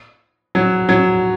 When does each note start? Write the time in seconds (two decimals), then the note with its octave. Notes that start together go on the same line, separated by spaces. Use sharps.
0.55 F#3
0.89 F#3